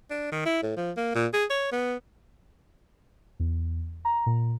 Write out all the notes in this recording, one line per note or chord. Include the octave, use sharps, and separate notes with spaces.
D4
D#3
E4
A2
F3
A#3
A#2
G#4
C#5
B3
E2
A#5
A#2